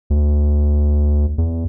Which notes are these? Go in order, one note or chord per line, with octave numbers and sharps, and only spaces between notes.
D2
E2